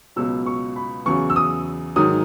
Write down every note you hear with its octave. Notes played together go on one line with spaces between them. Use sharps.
C#2 B2 F#3 E6
C#6
B5
E2 C#3 F#3 C#6
E6
D#6
G#2 D#3 F#3 D#6